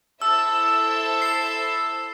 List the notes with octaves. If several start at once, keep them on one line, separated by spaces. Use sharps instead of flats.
E4 A4 C5 E5 A5 E6
C7